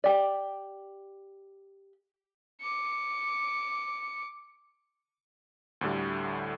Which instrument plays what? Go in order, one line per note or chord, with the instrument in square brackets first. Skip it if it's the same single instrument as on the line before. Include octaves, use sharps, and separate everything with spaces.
[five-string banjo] G4 D5
[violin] D6 C#7
[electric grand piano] D2 A2 D3 G3